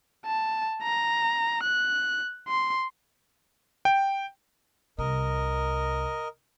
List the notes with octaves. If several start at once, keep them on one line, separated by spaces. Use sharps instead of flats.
A5
A#5
F#6
C6
G5
C2 C3 A#4 D#5